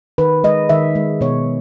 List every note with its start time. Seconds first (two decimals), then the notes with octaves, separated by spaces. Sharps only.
0.18 D#3 B4
0.44 G#3 D#5
0.69 D#3 E5
0.95 G#3
1.21 B2 C#5